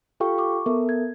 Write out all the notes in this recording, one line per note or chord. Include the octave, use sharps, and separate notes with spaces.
F4 G4 A4 F5 G5 C#6
C#6 D6
B3 A4 A#4 E5
G#6